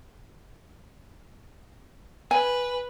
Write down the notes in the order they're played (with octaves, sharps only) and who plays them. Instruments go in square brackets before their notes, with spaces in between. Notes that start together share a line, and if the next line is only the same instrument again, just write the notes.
[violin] B4 [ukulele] G#5